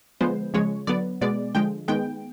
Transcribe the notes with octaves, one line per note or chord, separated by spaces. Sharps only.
D3 F3 G#3 B3 C5
C#3 F3 G#3 C#5
D3 F#3 B3 D5
B2 G#3 B3 D5
D3 F3 G#3 G5
D#3 G#3 B3 G5